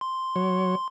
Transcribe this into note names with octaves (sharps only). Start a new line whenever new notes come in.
C6
F#3 C#5